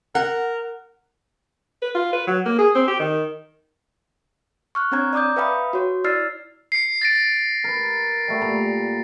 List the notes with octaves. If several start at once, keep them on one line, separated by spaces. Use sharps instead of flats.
A#4 F#5
B4
F4
B4
F#3
A#3
G#4
C4
G4
D#3
C#6 F6 F#6
C4 D4 C#5 A#5 G#6
D5 A#5 D6 D#6 G6
B4 E5 F5 G5 B5 D#6
F#4 C#5
E4 D5 E6 F6 A6 C7
C7 C#7
A6 A#6 D7
A#4 B4
G3 A3 B3
A#2 A#5